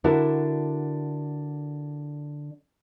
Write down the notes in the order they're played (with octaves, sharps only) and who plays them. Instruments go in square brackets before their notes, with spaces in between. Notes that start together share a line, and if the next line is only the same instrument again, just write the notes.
[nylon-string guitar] D3 D4 E4 F#4 A#4